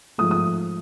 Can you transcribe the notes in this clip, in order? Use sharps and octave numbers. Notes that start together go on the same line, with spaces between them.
G#2 F3 A3 D#6
D#6